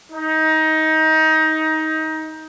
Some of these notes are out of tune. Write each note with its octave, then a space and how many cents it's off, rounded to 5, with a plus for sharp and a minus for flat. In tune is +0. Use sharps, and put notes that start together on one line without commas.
D#4 +20